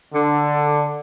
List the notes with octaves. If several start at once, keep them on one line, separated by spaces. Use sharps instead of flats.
D3